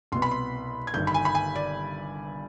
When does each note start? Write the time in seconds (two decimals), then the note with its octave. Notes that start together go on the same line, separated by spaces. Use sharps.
0.12 C2 B2 B3 C6
0.22 B5
0.31 C6
0.87 G#6
0.94 G1 G2 D#3 G6
1.07 B5
1.14 G#5
1.25 B5
1.35 G#5
1.56 D5